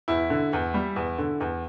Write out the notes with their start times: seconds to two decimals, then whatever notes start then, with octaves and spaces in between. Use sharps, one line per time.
0.08 E2 E4
0.30 D3
0.53 E2
0.74 G3
0.96 E2
1.19 D3
1.40 E2